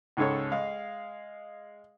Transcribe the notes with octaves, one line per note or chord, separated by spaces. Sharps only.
C#2 G#2 C#4 A4 C#5
G#3 F5